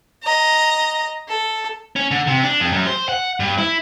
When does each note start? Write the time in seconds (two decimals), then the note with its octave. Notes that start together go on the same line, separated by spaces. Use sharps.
0.23 D#5 A#5
1.28 A4
1.96 C#4
2.11 D3
2.27 C3
2.44 D4
2.60 F2
2.72 F#2
2.87 C5
3.09 F#5
3.40 G2
3.58 E4